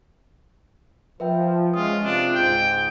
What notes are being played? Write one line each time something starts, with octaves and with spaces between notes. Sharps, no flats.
F3 B4 E5 G5
G#3 C#4 F4 D#6
C3 C4 D4 F4
C#2 G#2 G5